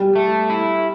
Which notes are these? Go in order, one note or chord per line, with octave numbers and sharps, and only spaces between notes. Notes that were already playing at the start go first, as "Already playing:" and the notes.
Already playing: G3
A3
E4